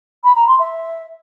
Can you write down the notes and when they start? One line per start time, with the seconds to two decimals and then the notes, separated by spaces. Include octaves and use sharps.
0.24 B5
0.35 A#5
0.47 C6
0.59 E5